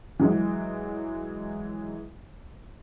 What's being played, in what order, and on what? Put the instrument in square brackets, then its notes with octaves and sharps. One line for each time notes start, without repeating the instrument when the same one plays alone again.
[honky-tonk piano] E3 F#3 G#3